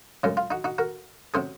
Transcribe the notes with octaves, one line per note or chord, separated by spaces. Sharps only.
F#2 C#3 G#3 C#4
F4
D#4 F#4
D#4 F#4
F#4 A#4
C3 F#3 C#4 G#4 C5